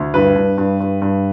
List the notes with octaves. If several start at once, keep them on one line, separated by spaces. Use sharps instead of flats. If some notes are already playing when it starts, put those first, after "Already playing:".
Already playing: D2
G2 B4
G2
G2
G2
G2